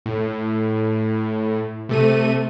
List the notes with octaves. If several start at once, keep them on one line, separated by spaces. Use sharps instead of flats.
A2
C3 A3 D#7